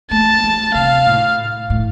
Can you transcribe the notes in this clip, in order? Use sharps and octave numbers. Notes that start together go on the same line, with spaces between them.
A3 A5
G3
C3 F5
A2
A2